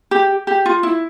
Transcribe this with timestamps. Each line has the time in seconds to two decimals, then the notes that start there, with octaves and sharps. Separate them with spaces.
0.11 G4
0.47 G4
0.66 F4
0.83 E4